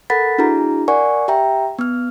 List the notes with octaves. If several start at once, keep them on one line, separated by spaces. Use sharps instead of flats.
A4 A#4 F#5 B5 A6 B6
D4 E4 F#4 G#4 A#5
A#4 D5 F#5 G#5 C#6
G4 E5 G5 A#5
B3 F6